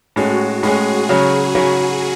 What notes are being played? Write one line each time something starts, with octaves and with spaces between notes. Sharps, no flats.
A2 G#3 C#4 F#4
A2 G#3 C#4 G#4
C#3 F#3 C#4
C#3 F#3 C#4